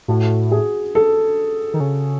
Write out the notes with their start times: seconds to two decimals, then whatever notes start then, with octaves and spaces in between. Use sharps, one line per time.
0.08 A2 F#4
0.51 G#4
0.95 A4
1.74 D#3
1.80 C#3